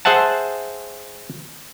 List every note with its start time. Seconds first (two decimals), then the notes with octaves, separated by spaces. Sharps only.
0.05 G#4 C5 E5 F#5 A5